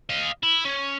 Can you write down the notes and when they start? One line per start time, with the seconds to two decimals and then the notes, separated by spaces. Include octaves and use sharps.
0.10 D#5 F5
0.43 E4
0.65 C#4